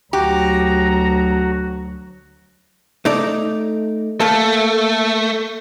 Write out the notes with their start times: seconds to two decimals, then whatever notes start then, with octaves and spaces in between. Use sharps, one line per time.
0.13 D2 F#3 F#4 G4 A#5
3.05 A3 D#4 D5
4.20 A3 A#3 A4